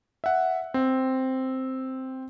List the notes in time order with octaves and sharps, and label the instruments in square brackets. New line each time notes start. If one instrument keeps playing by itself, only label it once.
[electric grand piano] E5 F#5
C4